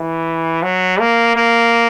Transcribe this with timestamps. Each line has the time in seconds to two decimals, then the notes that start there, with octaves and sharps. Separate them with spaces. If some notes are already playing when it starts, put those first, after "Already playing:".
Already playing: E3
0.63 F#3
1.00 A#3
1.37 A#3